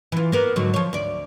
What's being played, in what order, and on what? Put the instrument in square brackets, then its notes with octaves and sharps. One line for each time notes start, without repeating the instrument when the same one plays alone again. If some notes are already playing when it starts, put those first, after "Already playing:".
[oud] E3 F4
A#3 B3 A#4
G#2 D3 F#3
F3 C#5
D2 D5